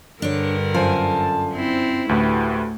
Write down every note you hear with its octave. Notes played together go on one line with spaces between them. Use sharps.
G2 D3 D4 A#4 C#5
F#2 F4 A4 C5 D5 G#5 A5
C4 E4
D2 A2 A3 F#4 G4 B4